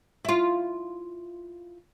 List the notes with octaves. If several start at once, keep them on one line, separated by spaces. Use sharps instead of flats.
E4 F4